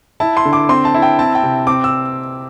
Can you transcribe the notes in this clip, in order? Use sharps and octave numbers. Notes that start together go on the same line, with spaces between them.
E4 A5
C6
D3
D6
C4 C6
A5
E4
G5
C4 A5
G5
C3
C4 D6
E6